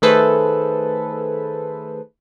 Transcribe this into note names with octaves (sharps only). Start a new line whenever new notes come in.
D#3 A3 G#4 A4 B4 C5